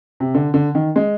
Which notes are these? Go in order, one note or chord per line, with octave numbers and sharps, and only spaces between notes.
C3
D3
D3
D#3
G#3